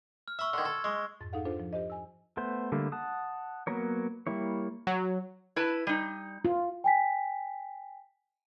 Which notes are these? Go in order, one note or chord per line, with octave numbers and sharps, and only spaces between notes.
F6
E5 B5 C#6 E6
D3 D#3 C6 G#6
A4
G#3 C#6
F2 G#2 A6
D#4 G#4 A4 F5 F#5
D4 F4 A4 C5
F3
G4 C5 D#5
G#5 E6
A3 B3 C5
D3 G3 A3 A#3
F#5 A5 D#6
F#3 A#3 B3 A#4 C#5
G3 A#3 E4 C#5
F#3
E4 B4 A5
G3 D#4
F4
G5 G#5 B6